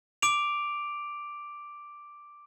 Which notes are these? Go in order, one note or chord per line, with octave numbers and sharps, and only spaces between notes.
D6 D7 F7